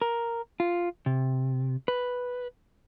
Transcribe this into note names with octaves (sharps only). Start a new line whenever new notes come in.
A#4
F4
C3
B4